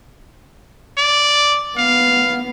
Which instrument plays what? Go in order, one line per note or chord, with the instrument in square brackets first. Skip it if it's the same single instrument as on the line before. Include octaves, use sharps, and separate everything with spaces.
[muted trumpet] D5
[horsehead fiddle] B3 [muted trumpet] F5